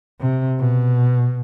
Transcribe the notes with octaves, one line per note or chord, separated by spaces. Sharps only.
C3
B2